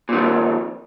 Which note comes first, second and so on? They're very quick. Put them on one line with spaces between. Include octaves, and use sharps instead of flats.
A#2 D#3 F2